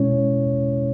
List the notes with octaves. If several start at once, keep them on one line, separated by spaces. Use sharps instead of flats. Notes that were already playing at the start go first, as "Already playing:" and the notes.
Already playing: B2 G#3 C#4 E4 C#5